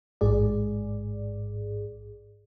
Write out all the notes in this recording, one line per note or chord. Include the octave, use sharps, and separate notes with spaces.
A1 G#2 G#4 D5